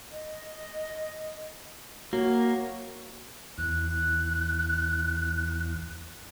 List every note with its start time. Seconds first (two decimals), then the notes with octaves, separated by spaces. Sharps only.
0.12 D#5
2.13 A#3 F#4 C#5
3.58 E2 F#6